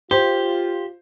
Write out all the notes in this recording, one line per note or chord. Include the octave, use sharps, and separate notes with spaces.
F4 G4 C5